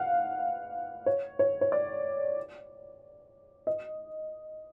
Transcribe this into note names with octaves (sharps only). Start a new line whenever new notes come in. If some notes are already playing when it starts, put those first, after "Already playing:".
Already playing: F5 F#5
C#5
C#5
C#5
D5
D#5